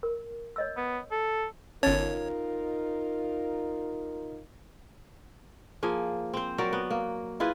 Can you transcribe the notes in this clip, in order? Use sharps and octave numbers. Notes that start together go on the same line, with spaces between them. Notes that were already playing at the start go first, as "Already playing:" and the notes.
A#4
C#5 D#5 E6
B3
A4
G1 C#4 D#4 F4 A#4 C#5
F3 A#3 G#4
C4 C5
F#3 A#4 D5
B3
A#3
E4 F4 G#4 B4